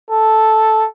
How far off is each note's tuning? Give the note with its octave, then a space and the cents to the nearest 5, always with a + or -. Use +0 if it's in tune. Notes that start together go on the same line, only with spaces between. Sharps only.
A4 -5